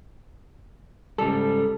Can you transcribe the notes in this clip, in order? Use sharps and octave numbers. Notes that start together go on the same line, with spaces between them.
G#2 C#3 G3 A4